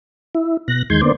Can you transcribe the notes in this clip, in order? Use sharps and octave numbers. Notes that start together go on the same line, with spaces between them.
E4
B2 F#6 A#6
E2 D#3 G#3 C6 G6 G#6
D3 A#3 B3 C5 D5